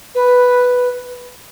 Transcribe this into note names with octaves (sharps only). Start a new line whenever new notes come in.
B4